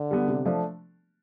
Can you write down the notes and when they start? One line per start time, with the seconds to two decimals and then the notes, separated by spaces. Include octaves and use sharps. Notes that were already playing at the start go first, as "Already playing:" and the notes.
Already playing: D3
0.11 G3 B3
0.28 C3
0.45 F3 A3 D4